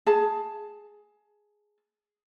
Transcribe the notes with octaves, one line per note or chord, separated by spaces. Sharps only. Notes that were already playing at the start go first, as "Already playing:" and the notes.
G#4 A5